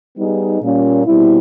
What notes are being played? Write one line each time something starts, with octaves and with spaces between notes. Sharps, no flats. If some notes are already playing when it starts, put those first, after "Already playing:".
G3 B3 D#4 G#4
A#2 G3 A#3 C#4 F4
B2 G3 C4 E4